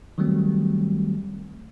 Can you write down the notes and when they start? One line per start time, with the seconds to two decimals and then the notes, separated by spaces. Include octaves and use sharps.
0.18 D#3 F#3 G3 A3 C4